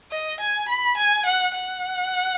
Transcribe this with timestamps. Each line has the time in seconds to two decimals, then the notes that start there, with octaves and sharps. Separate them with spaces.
0.12 D#5
0.40 G#5
0.69 B5
0.98 G#5
1.26 F#5
1.54 F#5